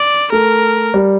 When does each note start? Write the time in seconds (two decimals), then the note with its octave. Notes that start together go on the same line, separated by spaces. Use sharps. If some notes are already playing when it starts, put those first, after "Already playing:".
Already playing: D5
0.32 A3 A#4
0.94 G3